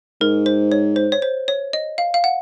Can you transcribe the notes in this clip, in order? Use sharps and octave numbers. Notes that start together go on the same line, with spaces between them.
G#2 A#4
C5
C#5
C5
C#5
C5
C#5
D#5
F5
F5
F#5